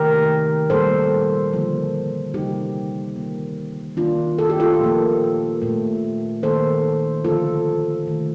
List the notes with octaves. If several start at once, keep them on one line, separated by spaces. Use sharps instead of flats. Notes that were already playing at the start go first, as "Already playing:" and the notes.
Already playing: C3 D#3 A3 G4 A#4
A#2 G3 A#3 A4 C5
D3 F3 A#3
C3 G3 A#3 D#4 G4
D#3 A#3
D#3 A#3 D4 F4
A4
G4
F4 A4
A#2 F3 A#3
A#2 A3
D#3 A#3 A4 C5
D3 F3 A#3 F4 A4
C3 D#3 A3